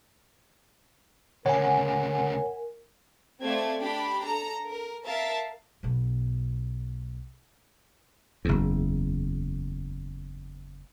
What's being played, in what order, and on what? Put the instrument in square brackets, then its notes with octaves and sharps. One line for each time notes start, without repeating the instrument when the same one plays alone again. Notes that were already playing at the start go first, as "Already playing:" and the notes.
[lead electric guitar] D2 C#3 [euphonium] A#4 [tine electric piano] C#5 [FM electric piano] F#5 G#5
[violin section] A3 C4 D5 F5 G#6
D4 G4 B5
A4 A#5
A#4
A#4 E5 F5 A5 A#5 A6
[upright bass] B1 B3
[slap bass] F#1 E2